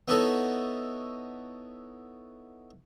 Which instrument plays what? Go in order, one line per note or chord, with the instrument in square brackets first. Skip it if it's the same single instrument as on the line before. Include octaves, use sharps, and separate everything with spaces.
[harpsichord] B3 D#4 E4 F#4 A4 C#5